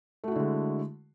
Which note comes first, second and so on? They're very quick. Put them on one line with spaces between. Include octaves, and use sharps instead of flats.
A3 F#4 E4 D3 G#3